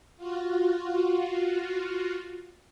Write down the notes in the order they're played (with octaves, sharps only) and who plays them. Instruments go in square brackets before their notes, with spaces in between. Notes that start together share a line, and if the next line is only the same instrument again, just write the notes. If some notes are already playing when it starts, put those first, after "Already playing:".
[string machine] F4 F#4